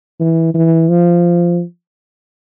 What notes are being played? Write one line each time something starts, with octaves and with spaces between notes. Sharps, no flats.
E3
E3
F3